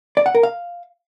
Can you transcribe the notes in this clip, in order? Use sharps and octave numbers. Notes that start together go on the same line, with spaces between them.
D5
F#5
A#4
F5